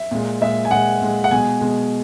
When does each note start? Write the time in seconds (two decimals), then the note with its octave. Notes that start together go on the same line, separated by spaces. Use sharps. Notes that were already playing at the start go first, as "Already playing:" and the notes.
Already playing: E5
0.11 A#2 G#3
0.41 A#2 G#3 E5
0.65 G#5
0.71 A#2 G#3 F#5
1.01 A#2 G#3
1.24 F#5
1.31 B2 G#3 G#5
1.61 B2 G#3